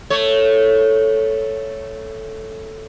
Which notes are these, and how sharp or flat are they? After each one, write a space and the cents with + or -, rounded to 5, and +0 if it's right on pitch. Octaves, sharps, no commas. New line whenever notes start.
A3 +0 C#5 +0